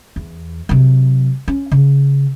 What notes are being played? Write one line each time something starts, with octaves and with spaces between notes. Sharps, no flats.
E2
C3 F#3
C#4
C#3